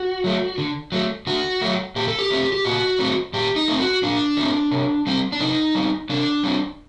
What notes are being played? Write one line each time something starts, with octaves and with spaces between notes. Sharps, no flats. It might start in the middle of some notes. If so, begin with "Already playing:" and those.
Already playing: F#4
F#3 A3
D3
F#3 A3
D3 F#4
F#3 A3
A#2 G4
A4
G4
A3 C4
G4
A#2 F#4
A3 C4
A#2 G4
D#4
A3 C4
F#4
A#2 D4
A3 C4
C3
G3 C4
D4
C3 D#4
G3 C4
C3 D4
G3 C4